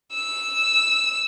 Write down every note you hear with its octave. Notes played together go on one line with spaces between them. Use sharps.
E6